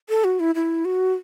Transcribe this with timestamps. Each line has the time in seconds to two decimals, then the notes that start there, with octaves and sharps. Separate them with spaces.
0.09 A4
0.24 F#4
0.40 E4
0.55 E4
0.85 F#4